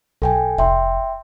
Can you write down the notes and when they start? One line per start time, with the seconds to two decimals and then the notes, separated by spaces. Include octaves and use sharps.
0.22 B1 A4 G5 G#5
0.58 F1 E5 G5 C6